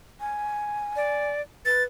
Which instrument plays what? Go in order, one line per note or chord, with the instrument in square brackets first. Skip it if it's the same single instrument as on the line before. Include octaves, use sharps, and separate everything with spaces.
[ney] G#5
[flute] D5
[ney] B4 [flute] A6